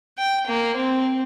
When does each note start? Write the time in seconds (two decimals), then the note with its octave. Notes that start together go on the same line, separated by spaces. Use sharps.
0.18 G5
0.47 A#3
0.76 C4